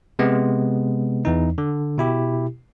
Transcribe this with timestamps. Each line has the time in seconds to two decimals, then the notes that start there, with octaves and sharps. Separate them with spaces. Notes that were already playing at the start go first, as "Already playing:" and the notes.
0.19 C3 G#3 B3
1.25 E2 E3 D#4
1.58 D3
1.98 B2 E4 G4